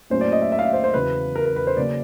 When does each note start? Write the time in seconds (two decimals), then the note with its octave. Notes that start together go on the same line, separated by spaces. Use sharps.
0.10 A2 F#3 A#3 C#4 C5
0.21 D5
0.32 D#5
0.42 E5
0.52 E5
0.59 F5
0.63 E5
0.73 C5
0.84 C5
0.94 E2 C#3 F#3 B4
1.35 A#4
1.46 A#4
1.56 B4
1.67 C5
1.77 C#3 F#3 A#3 C#4 D5